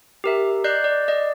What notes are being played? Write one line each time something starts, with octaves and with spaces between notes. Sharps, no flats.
G4 A#4 E5
D5 D#5 F#6 G6 C7
D5
D5 D#5